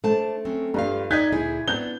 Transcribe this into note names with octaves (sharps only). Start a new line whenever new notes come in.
A3 D4 C5 A5
F#3 C4 C#4
G2 G3 F4 F5
D#4 D5 D#5 G6 G#6 B6
D2 A#2 E4 G#4
B3 D4 G6 G7